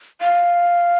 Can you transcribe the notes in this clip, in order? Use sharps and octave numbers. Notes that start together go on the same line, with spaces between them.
F5